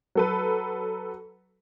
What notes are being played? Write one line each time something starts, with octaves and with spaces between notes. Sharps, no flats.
F#3 A4 B4